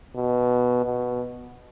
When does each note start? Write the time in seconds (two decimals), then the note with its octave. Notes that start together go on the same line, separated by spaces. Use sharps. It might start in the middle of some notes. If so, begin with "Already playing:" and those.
0.16 B2
0.85 B2